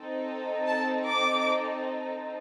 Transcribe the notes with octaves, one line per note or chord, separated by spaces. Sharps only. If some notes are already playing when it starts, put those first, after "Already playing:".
Already playing: C4 D#4 A4
A5
D6